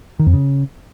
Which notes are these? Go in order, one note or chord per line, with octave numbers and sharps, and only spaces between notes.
D#3
F2
C#3